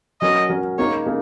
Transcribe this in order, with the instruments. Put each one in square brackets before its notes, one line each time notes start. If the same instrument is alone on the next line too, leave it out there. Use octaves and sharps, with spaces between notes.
[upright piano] F#3 C#4 A#4 [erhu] D#5
[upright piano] F#3 C#4 A#4
[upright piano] C#3 A#3 D#4 A#4 [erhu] C#5
[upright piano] C#3 A#3